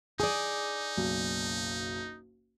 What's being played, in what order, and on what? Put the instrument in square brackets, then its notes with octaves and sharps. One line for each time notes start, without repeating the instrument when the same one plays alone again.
[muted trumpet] D#4 [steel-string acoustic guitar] G#4 D5 [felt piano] D#6
[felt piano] F#1 B1